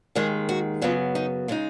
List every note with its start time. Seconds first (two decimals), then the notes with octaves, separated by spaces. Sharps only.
0.15 D#2 D#3 G#3 G#4
0.49 F#4
0.81 F#2 C#3 F#3 B3 F4
1.15 D#4
1.48 C#3 G#3 D#4 F4